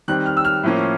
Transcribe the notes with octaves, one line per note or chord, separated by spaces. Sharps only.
D#3 G3 C4 F#6
F6
E6
F6
A2 F3 A#3 C#4